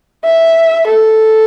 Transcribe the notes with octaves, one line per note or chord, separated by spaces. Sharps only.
E5
A4